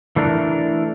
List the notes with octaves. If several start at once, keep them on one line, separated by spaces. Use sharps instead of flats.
E3 A3 D4 A#4